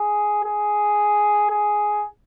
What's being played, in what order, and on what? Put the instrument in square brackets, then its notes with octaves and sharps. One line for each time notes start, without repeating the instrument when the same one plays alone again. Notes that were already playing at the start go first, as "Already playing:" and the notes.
Already playing: [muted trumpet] G#4
G#4
G#4